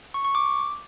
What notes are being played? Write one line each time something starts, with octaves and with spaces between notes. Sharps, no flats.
C#6
C#6
D6